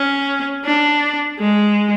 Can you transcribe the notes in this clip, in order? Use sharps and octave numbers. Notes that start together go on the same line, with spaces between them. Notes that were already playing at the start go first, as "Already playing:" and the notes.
Already playing: C#4
D4
G#3